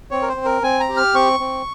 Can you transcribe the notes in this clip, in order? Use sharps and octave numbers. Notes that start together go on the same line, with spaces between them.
C4 C#5
A#4
C5
C4
A#4
C4 G#5
A#5
G4
F6
C4 C#6
C4